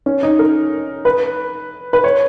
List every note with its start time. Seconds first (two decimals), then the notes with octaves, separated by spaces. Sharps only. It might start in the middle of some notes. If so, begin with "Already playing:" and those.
0.06 C#4
0.23 D#4
0.39 A#4
1.05 B4
1.93 B4
2.04 C#5